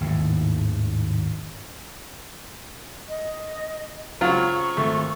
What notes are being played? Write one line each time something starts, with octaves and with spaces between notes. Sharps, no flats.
G#1 D#2 A2
D#5
C#3 F#3 C4 F4 C#6 F6
G#1 A3